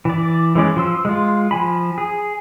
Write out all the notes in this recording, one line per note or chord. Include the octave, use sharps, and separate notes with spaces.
E3 D5
E3 G#3 C#4 D5
F3 C6 E6
G#3 F4
F3 G#5 B5
G#4